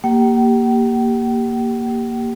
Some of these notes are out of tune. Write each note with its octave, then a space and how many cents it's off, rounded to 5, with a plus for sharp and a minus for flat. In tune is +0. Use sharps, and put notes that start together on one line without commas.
A#3 +0 G4 +0 G5 -40